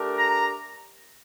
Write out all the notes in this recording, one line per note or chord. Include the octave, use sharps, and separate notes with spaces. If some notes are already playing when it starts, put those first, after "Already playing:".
Already playing: A3 D4 G4 A#4
A#5